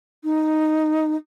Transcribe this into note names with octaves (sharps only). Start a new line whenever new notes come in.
D#4